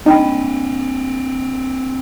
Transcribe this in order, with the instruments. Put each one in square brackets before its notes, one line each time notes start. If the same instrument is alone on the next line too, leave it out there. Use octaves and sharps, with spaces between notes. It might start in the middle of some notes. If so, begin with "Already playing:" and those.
[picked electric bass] C4 D4 [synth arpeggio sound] D#4 [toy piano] D#5 G5 B5